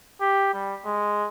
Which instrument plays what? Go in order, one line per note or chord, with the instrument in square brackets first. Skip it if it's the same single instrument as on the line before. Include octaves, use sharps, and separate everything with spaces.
[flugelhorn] G4
G3
G#3